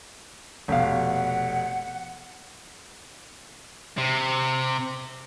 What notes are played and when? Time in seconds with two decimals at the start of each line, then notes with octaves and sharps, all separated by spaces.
0.68 F1 B2 F5 F#5
3.98 C3